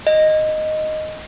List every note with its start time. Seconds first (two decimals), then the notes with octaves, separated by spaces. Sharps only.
0.07 D#5